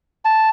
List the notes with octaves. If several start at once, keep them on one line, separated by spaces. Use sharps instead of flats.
A5